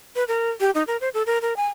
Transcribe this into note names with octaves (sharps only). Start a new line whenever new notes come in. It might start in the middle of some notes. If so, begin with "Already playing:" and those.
B4
A#4
G4
D#4
A#4
C5
A4
A#4
A#4
G#5